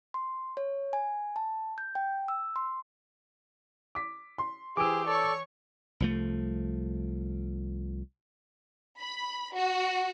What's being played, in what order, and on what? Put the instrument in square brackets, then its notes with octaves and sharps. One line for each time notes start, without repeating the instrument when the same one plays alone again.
[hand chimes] C6
C#5
G#5
A5
G6
G5
E6
C6
[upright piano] D6 B6
C6
[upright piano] E3 D7 [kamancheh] G4 C5 [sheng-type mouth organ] G#4 [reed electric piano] D6 E6
[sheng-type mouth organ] A4 D5 [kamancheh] C#5 C#6
[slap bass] C2 F3 A3
[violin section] B5
F#4